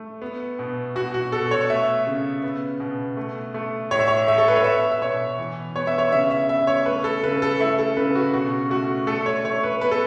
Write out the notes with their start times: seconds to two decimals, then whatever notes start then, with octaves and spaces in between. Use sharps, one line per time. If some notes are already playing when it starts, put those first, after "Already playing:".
Already playing: A3
0.22 B3
0.59 B2
0.95 B2 F#4
1.14 F#4
1.32 B2 A4
1.51 C#5
1.70 A3 E5
2.07 C#3
2.43 B3
2.80 B2
3.17 A3
3.54 A3
3.91 A2 C#5
3.99 E5
4.08 C#5
4.27 A3 E5
4.38 A4
4.48 B4
4.56 C#5
4.64 B3 E5
4.92 E5
5.01 B2 C#5
5.38 E3
5.76 B3 C#5
5.87 E5
5.98 C#5
6.12 C#3 E5
6.31 E5
6.49 B3 E5
6.67 C#5
6.86 A3 B4
7.04 A4
7.23 C#3 B4
7.42 A4
7.60 A3 E4
7.79 A4
7.97 C#3 B4
8.15 F#4
8.33 B2 F#4
8.70 A3 F#4
9.07 A3 A4
9.26 C#5
9.44 A3 C#5
9.63 B4
9.81 B3 B4
9.91 A4